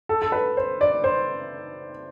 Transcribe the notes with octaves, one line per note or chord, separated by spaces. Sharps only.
A4
A4
B4
C5
D5
C5